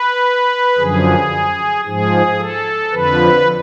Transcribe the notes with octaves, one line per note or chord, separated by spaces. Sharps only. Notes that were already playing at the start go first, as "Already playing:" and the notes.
Already playing: B4
F#2 D3 F3 G#4
G#2 F3 G#4
A4
F2 D3 F3 B4